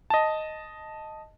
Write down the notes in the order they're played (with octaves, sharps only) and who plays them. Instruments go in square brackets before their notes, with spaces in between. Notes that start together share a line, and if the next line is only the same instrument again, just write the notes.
[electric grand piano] D#5 A5